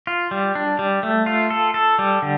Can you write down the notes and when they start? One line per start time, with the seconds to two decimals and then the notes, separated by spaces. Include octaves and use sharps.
0.07 F4
0.31 G3
0.55 D4
0.79 G3
1.03 A3
1.26 F4
1.50 A4
1.74 A4
1.99 G3
2.22 D3